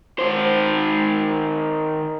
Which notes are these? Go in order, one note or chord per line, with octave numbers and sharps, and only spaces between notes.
D#3 C5